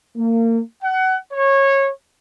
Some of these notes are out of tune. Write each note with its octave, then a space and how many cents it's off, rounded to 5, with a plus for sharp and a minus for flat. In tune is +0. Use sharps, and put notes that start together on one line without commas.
A#3 -30
F#5 +25
C#5 -20